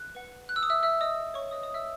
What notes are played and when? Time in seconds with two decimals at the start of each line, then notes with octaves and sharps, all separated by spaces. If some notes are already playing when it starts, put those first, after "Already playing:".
Already playing: F#6
0.15 B4 F#5
0.49 F#6
0.56 E6
0.63 D#6
0.70 E5 E6
0.83 E5 E6
1.01 D#5 D#6
1.34 C#5 C#6
1.51 B4 D#5 E5 D#6
1.63 D#5 D#6
1.74 E5 E6